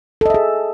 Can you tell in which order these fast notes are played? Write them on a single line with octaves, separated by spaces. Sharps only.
A4 D#5 E5 G#4